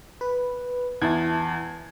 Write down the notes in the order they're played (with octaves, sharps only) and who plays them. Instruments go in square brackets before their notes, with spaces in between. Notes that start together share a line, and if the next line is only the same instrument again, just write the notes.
[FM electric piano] B4
[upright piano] E2 [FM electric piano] E4 A5 G#6